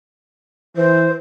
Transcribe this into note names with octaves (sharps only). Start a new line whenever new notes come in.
E3 C5